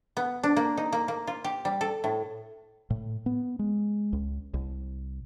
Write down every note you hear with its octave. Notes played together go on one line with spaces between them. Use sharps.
B3
D4
A#3
D#4
A#3
A#3
F4
G4
G3
A4
A2
A2
B3
G#3
C#2
C2